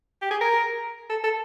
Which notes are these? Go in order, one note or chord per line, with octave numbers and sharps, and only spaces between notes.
G4
G#4
A#4
A4
A4